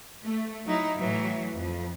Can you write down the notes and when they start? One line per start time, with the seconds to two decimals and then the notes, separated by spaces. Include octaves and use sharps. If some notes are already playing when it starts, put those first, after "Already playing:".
0.25 A3
0.66 F#3 D#4 E4
0.97 A2 E3 F#3
1.57 F2